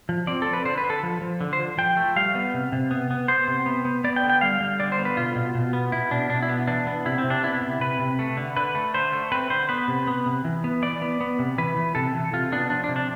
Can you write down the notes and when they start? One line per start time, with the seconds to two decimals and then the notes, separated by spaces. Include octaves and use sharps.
0.09 F3
0.27 C4 D5
0.42 C4 A4
0.53 B4
0.65 D3 C5
0.78 B4
0.83 D3
0.90 A4
1.03 F3
1.21 F3
1.41 D3
1.53 C5
1.59 F3
1.78 F3 G5
1.97 A3
2.16 G3 F5
2.35 B3
2.54 C3
2.72 C3
2.91 B3
3.11 B3
3.28 B3 C5
3.48 C3
3.66 B3
3.85 B3
4.04 B3 D5
4.16 G5
4.24 D3
4.30 G5
4.41 G3 F5
4.61 G3
4.80 D3 D5
4.92 C5
4.98 B3
5.05 B4
5.17 B2 F4
5.35 B2
5.55 B2
5.73 B3
5.92 B2 E4
6.11 B2 D4
6.30 B2 D4
6.43 E4
6.49 B3
6.67 E3 D4
6.87 B3
7.06 C3 E4
7.18 C4
7.24 C3
7.30 D4
7.43 B3 E4
7.62 C3
7.80 C3 B4
7.99 C3
8.19 A3
8.37 D3
8.57 D3 B4
8.75 A3
8.94 D3 C5
9.12 A3
9.32 C4 B4
9.50 D3 C5
9.69 B3 B4
9.88 C3
10.07 B3
10.26 C3
10.45 E3
10.64 B3
10.82 E3 D5
11.02 B3
11.21 B3
11.39 C3
11.58 E3 B4
11.76 E3
11.95 C3 A4
12.15 E3
12.33 C3 F4
12.52 B3 D4
12.70 F3 D4
12.84 D4
12.89 C3
12.96 D4